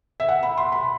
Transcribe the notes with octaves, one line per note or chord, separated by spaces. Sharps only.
E5
F#5
B5
C6
B5